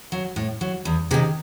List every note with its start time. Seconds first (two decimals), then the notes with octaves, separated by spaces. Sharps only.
0.12 F#3
0.36 A2
0.61 F#3
0.85 E2
1.11 C3 G#4
1.14 D#3